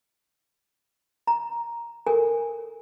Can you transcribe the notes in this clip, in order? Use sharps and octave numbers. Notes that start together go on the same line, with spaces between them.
A#5
A4 A#4 G#5